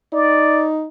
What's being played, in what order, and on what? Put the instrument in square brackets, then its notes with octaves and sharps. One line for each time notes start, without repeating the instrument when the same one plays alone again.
[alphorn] D#4 [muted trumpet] D5